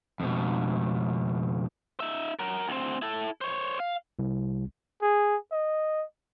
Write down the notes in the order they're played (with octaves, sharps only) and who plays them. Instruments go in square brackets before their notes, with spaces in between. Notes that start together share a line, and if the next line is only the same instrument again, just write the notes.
[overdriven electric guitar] F2 B2
[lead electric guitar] D#4 E5
F#3 A#4
D2 C4
E4 A4
C5 C#5
F5
[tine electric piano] C2
[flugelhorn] G#4
D#5